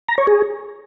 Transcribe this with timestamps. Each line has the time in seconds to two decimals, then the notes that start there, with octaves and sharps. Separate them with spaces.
0.09 A#5
0.18 C#5
0.27 G#4